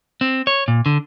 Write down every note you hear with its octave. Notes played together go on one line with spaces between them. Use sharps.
C4
C#5
A#2
D3